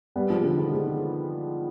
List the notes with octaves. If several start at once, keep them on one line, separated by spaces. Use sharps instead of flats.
G3 B3
F3 G#3
D3
D#3
G#3 C4